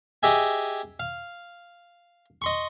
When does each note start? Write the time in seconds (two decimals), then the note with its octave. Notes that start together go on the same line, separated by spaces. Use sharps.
0.23 G4 G#4 D#5 E5 G#5
1.00 F5
2.42 D#5 C6 C#6